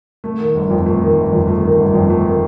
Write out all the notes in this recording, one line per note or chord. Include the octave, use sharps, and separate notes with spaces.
A3
D#3
G1
F2
A3
D#3
G1
F2
A3
D#3
G1
F2
A3
D#3